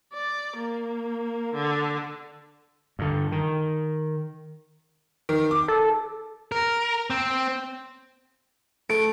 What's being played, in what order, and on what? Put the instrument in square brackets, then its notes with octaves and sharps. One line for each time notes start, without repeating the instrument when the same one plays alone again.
[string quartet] D5
A#3
D3
[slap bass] G2 D3
D#3
[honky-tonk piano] D#3
D6
[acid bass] A4
[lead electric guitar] A#4
C4
[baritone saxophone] A3 [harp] D7